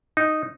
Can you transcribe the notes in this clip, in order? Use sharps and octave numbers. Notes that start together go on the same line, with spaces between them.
D#4